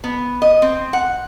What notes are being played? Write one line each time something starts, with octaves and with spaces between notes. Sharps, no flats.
B3
D#5
C4
F#5